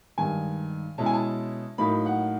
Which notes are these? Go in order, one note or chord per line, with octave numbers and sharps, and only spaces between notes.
G2 D#3 G#3 G#5
B2 G#3 C#4 E4 A5
G#5
A5
A2 F#3 A#3 D#4 B5
F#5